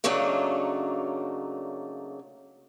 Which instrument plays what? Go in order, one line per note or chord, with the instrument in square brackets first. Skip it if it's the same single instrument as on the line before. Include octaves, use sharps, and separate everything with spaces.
[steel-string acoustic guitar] C#3 F#3 A3 A#3 D4 D#4